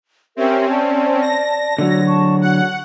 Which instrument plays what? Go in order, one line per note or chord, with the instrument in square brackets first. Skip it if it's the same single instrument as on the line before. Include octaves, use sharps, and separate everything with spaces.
[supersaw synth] C4 C#4 [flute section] G4 A#4 E5
[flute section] D5 A5
[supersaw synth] A#6
[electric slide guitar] D3 F#3 [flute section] F#4 E6
[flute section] A5 C#6
[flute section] F#4 F#6 [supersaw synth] F#5